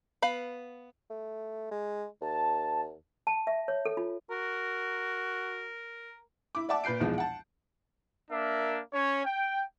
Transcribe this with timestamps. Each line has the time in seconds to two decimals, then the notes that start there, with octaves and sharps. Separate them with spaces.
0.22 B3 F5 B5
1.10 A3
1.71 G#3
2.21 D#2 A5
3.27 A5
3.47 E5
3.68 C#5
3.85 A4
3.97 F4
4.31 F#4 A#4
6.55 E4 D6
6.69 D5 E5 F#5 A5 D6
6.84 A#2 B4 G6 C7 D7
7.00 B1 E2 F3 G#3
7.18 F#5 A5
8.31 A#3 D4 A#4 E5
8.93 C#4 C#5
9.25 G5